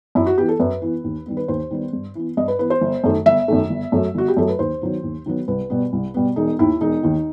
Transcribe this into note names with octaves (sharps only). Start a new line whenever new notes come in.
F#2 E4
F#4
E3 B3 G4
A4
F#2 B4
E3 B3
D#2
D#3 G3 B3
B4
D#2 C5
D#3 G3 B3
G2
E3 B3
G2 D#5
B4
E3 B3 B4
C5
G1
F#2 D#3 A3
G1 E5
F#2 D#3 A3
G1
F#2 F#3 A3
G1 F#4
G4
F#2 F#3 A3 A4
B4
D#2 C5
D#3 F#3 B3
D#2
D#3 F#3 B3
C2 B4
B2 G3 B3
C2
B2 G3 B3
E1 D#4
D#2 D#3 E4
E1 D#4
D#2 D#3